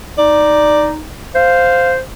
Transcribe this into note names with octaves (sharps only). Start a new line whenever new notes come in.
D#4 D5
C5 F5